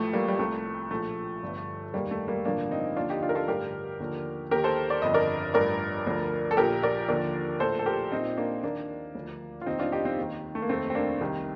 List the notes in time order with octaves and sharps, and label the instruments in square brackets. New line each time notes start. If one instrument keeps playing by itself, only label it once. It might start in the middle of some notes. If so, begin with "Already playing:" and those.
Already playing: [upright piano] A1 A2 F3 A3
G3 A#3
G3
C2 C3 F3 A3
A#1 A2 F3 A3
G1 G2 D3 F3
F1 D#2 D#3 G3 A#3
A3
G3 A#3
A1 G2 D3 F3 A#3 D4
C4 D#4
D#2 D3 F3 D4 F4
D#4 G4
D4 F4
A#4
F4 A4
A1 G2 D3 G4 A#4
D#2 D3 F3
D#2 D#3 G4 A#4
A4 C5
D5
G1 F2 D3 D#5
A#4 D5
A1 G2 F3 A#4 D5
D2 D3 F3
A4
A#1 A#2 F3 G4 A#4
A#4 D5
D#2 D3 F3 A#4 D5
A#1 A2 F3 A4 C5
A4
G4 A#4
A#1 A#2 F3 C4 D#4
A#3 D4
D#2 D#3 A#3 D4
D2 D3 F3
F4
F1 D#2 D#3 C4 D#4
D4 F4
D#4 G4
C4 D#4
D#2 D#3
A3
A#3
F1 D#2 D#3 A3 C4
C4
A#3 D4
C2 C3 D#3